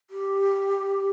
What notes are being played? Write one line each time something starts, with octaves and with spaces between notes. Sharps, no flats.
G4